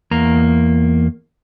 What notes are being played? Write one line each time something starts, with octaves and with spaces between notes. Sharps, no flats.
E2 A#3 A#5